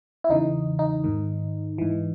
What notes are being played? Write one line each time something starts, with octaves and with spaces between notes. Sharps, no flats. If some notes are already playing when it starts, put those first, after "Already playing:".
E4
E2 C#3 E3 D#4
D#4
G#2 D#3
G#2 E3